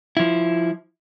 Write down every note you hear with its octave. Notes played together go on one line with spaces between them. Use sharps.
F3 E4